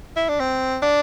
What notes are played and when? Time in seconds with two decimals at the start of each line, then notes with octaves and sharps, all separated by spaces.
0.16 E4
0.29 D4
0.40 C4
0.82 D4